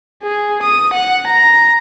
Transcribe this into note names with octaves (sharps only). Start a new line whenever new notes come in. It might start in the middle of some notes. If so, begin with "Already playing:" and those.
G#4
D#6
F#5
A#5